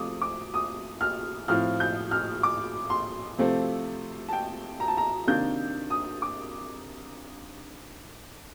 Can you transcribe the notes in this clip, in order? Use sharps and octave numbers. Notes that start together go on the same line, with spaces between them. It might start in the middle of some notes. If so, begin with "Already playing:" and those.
Already playing: C3 F3 A3 D6 D#6
D6
D#6
F6
A2 F3 C4 F6
G6
F6
D6
C6
C3 F3 A3 C4
A5
G5
A#5
A5
A#5
C3 D#3 A#3 D4 G6
D#6
D6